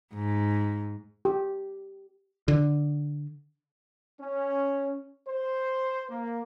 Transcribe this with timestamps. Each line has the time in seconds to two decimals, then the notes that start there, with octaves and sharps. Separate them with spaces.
0.14 G#2
1.25 G4
2.48 D3
4.19 C#4
5.26 C5
6.10 A#3